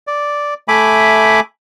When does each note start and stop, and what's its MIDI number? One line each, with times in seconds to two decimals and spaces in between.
0.07 0.54 74
0.68 1.40 57
0.68 1.40 76
0.68 1.40 80
0.68 1.40 83
0.68 1.40 86